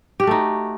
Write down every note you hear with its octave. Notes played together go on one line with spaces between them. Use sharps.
A3 D#4 F#4 G4